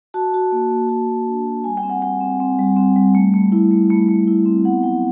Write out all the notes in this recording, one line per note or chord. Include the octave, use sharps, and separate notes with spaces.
F#4 A5
F#4
A#3
A#3
F#4
A#3
D4
F#4
G3 G#5
G5
C4
F#5
G3 G5
C4
C4
G3
C4
G3
A3
A3
E4
A3
A3
A3
E4
C4
B3 F#5
F#3 G5